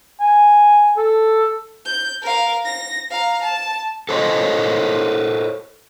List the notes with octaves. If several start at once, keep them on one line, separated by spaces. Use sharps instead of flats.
G#5
A4
G6
A#4 F5
A#6
F5 A#5
A5
A4 C5 C#5 D#5